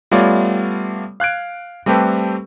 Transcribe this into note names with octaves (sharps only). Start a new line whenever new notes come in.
G3 A3 B3 F4 C#5 D5
F5 F#6 G#6 D7
G3 A3 C4 G4 A4 B4